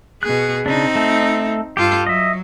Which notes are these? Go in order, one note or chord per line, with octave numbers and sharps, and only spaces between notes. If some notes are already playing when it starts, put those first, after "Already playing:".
B2 G#4 F#6
C#3 C4 D4 D#4
A3 A4
G2 F4 G4 A4
F#3 D#5 E5